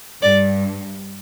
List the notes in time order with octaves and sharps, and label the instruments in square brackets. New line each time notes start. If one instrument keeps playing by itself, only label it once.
[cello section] G2 [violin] D5